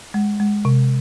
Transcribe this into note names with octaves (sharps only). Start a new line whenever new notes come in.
G#3
G#3
C3